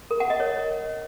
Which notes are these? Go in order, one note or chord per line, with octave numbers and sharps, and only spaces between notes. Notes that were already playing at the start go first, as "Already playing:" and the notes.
A#4
F#5
D#5
C#5